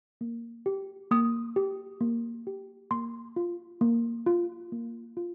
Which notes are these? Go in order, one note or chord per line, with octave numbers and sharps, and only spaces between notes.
A#3
G4
A#3 D#6
G4
A#3
G4
A#3 C6
F4
A#3
F4
A#3
F4